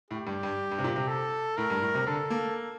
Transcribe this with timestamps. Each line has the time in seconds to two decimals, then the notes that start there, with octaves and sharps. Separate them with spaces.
0.10 A2 G4
0.27 G2
0.43 G2
0.72 G2
0.78 C3
0.84 A#2
0.96 C3
1.08 A4
1.57 A2 A#4
1.70 G2
1.82 A2
1.95 C3
2.07 D3 A4
2.30 A#3